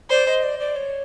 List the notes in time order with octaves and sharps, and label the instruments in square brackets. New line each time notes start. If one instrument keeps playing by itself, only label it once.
[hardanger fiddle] C5 [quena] D5
[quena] D#5
D5
D5
C#5